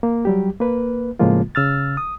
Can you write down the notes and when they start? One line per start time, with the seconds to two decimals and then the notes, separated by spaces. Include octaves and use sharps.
0.03 A#3
0.25 F#3 G3 G4
0.60 A#3 B4
1.19 A2 C#3 F3 G#3 A#3 F4
1.55 C#3 E6 F6 A6
1.97 D#6